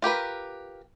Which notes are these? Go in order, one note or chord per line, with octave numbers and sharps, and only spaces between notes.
F4 G4 A#4 B4